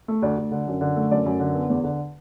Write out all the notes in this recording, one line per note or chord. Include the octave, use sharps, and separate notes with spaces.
A3
D2 D5
D2
D3
F#2
D3
A3
F#2 D5
F#2
D3
B3
E2
D3